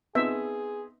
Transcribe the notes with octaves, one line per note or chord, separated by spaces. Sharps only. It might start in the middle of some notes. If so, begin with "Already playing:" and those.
B3 C4 D#4 G#4 E5